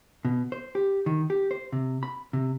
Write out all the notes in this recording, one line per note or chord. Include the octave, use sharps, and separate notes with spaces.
B2
C5
G4
D#3
G4
C5
C3
B5
C3